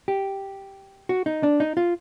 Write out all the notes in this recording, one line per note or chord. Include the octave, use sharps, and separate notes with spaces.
G4
F#4
D#4
D4
D#4
F4